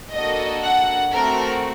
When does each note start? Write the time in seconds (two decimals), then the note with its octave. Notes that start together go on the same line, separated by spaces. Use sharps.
0.13 A#3 D4 F#4 A4 D#5
0.63 F#5
1.12 A3 C4 F#4 A4 A#4